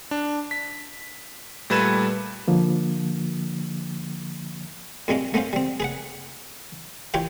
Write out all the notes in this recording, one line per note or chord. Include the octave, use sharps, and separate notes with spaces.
D4
B6
A#2 G3 A3 B4 G#6 E7
D3 F3 A#3
F2 G3 G#3 C#4 F5
A3 B3 C#4 C5 F5
G3 C4
G#4 B4 F#5
E3 F4 G4 C#5 G5